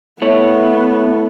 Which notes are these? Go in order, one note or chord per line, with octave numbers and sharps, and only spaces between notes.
A3 B3 E4 C#5